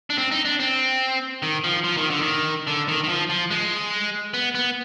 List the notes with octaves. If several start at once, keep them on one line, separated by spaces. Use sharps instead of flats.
D4
C4
D#4
D4
C4
D#3
F3
F3
D#3
D3
D#3
D3
D#3
D#3
F3
F3
G#3
B3
B3